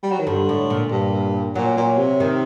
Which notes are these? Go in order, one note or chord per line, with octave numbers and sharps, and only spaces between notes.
G3
F#3
D#3
G2 D3
A2
A#2
G2
A#2 F#3
A#2
C3
D#3